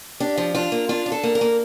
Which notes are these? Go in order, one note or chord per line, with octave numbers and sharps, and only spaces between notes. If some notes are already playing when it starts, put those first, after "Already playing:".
D4 G4
F3
D4 F4
A#3
D4 F4
D4
A4
A#3
A#4
A#3